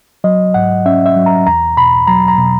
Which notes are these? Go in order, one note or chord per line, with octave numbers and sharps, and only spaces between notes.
F#3 D#5
G#2 F#5
C#4 E5
E5
F#3
A#5
E2 A#5
B2 B5
F#3 A#5
A#5
B2